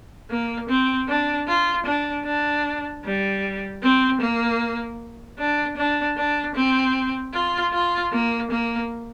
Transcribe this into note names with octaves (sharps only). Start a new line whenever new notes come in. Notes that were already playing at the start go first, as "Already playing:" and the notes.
A#3
C4
D4
F4
D4
D4
G3
C4
A#3
D4
D4
D4
C4
F4
F4
A#3
A#3